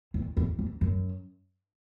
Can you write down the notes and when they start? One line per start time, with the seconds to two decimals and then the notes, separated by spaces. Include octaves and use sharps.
0.14 E2
0.37 E2
0.59 E2
0.81 F#2